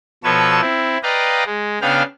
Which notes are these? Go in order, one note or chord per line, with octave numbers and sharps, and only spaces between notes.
B2 F3 A4 B4 C#5 E6
C4 E4
B4 D5 D#5 F5 G5 A#5
G#3
C#3 B3 D4 F5 G5 F6